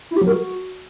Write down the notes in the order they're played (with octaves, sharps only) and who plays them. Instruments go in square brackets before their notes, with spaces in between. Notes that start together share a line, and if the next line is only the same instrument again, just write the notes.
[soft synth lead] E4
G4
F#3
A#4
F#4